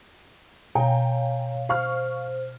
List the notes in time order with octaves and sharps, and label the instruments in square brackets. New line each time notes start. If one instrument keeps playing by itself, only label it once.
[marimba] B2 [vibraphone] C#5 F5 [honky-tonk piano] G5 G#5 A#5
[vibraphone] C5 [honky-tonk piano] F5 C#6 F6